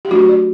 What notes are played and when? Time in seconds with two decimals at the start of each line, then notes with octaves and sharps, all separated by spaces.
0.05 G4
0.11 F#3 A3 D4 F#4
0.29 D5